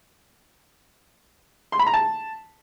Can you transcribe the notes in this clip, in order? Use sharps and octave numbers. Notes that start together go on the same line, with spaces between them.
C6
B5
A#5
A5